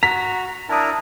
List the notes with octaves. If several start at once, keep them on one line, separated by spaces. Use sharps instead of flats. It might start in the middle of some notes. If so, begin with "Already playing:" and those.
F#4 A#5 B6
D4 E4 A#4 A5 D#6